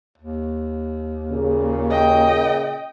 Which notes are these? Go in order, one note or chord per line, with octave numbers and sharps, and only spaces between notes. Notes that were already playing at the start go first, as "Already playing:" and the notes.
D#2
A#2 C#3
D#5 G5